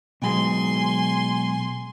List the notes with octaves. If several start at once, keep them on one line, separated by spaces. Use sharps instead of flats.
B2 F#3 G#3 G#5 C6